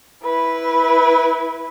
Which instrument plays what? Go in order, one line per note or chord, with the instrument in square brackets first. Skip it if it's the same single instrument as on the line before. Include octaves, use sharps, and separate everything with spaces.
[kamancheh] E4 B4